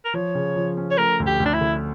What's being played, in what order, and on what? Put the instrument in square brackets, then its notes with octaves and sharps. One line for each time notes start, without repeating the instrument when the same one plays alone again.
[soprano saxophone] A#4
[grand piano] F3 [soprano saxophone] C#5
[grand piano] C#3
F3
C#4
[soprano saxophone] C#5
[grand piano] A3 [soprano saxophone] A#4
[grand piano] D2
[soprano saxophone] G4
[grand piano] D2
[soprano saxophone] D4
E4
[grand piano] D3